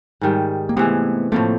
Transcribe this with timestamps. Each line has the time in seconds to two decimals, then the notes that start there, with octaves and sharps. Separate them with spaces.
0.21 G#2 D#3 G3
0.69 A#3
0.77 C3 E3 G#3 A3 B3
1.32 A2 F3 A3 A#3 C4